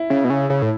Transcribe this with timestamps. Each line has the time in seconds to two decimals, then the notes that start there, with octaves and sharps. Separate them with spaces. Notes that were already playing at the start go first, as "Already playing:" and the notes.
Already playing: E4
0.10 C#3
0.24 B2
0.30 C#3
0.50 C#3
0.62 A2